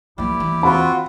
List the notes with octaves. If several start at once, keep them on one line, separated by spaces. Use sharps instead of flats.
F3 A#3 E4 G4 D5
D#2 E3
C4 F4 F#4 B5